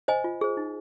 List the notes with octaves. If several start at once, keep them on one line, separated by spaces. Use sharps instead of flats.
C5 D#5 G#5
F4
G#4 C5
D#4